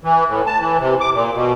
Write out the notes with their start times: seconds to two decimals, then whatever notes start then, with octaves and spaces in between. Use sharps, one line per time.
0.04 E3
0.28 A2
0.46 A5
0.60 E3
0.79 C3
1.01 D6
1.13 A#2
1.34 B2